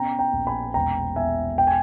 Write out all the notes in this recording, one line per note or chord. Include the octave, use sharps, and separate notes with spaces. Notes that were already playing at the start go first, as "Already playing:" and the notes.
Already playing: B2 C#4 G5 A#5
G5 A#5
A#1
G#5 B5
E1 G5 A#5
E2 E5 G#5
G5
G#5